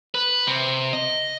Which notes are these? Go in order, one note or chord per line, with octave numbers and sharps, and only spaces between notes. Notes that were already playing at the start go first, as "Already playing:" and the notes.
B4
C3
D#5